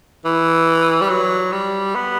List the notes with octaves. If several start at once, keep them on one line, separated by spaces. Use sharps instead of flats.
E3
G3
F#3
G3
B3